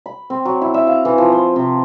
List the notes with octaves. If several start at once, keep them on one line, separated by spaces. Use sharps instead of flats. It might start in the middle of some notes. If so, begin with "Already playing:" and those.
B5
C4
F#3
E4
E5
F5
E3
F3
C5
C3